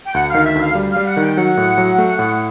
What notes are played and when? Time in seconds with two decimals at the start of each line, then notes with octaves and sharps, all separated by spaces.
0.06 G5
0.14 D2 F#5
0.30 D#3 F5
0.45 E5
0.55 D2
0.61 F5
0.75 G3
0.91 F5
0.96 G3
1.07 F#5
1.17 D#3 G5
1.32 G5
1.37 F#3 F#5
1.57 A2
1.78 F#3
1.98 A3
2.19 A2